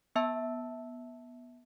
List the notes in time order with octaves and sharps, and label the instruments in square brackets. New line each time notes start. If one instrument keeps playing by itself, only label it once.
[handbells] B3 E5 A5 E6